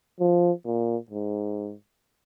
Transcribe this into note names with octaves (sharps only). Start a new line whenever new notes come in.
F3
A#2
G#2